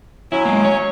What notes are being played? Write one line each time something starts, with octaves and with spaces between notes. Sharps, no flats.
F#3 C#4 E4
G#3 A#3
C#5